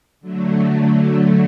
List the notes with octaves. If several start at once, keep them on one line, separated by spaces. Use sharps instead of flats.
D3 F#3 A3